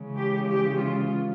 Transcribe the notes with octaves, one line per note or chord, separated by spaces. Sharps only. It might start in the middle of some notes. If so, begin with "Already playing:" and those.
Already playing: C#3 E3 G#3
G4
G4
F4